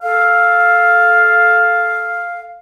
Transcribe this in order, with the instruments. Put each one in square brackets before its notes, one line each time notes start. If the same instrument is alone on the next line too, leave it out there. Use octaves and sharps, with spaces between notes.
[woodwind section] A4 F5